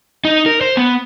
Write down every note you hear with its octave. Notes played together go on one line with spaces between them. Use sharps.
D#4
A#4
C5
B3